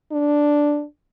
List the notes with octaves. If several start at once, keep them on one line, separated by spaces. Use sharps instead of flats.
D4